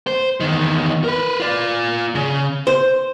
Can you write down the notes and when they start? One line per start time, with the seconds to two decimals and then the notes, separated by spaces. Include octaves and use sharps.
0.07 C5
0.40 E2 D#3
1.04 A#4 B4
1.40 F4 D5
2.15 C#3
2.67 C5